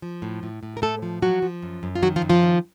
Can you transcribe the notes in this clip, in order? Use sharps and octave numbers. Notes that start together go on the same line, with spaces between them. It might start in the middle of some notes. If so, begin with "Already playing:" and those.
F3
A2
A2
A2
A#4
A2 A3 A4
F3
F3 F#3 F#4
F3
F#2
F#2
F4
D#3 F#3 F#4
F3 F4
F#2
F3 F4
D#3